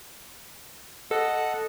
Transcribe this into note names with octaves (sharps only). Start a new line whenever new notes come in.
A4 D#5 F#5 A5